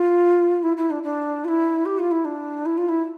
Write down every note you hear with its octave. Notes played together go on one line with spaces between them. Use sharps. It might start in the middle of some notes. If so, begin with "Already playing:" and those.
Already playing: F4
E4
E4
D4
D4
F4
E4
G4
F4
E4
D4
E4
F4
E4